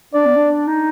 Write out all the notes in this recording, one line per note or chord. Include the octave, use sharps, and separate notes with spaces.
D4 D5
B3
D4
D#4